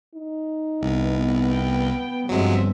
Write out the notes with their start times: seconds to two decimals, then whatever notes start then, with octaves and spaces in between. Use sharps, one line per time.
0.15 D#4
0.81 C2 B3
1.52 G5
2.29 G1 G2 F3 F#3 G#3 C4 E5